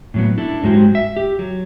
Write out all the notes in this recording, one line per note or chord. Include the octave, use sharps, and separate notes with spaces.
A2 F#3 B3
D4 E4 A4
G#2 F#3 G#3 F#4 G4
E5
G4
F#3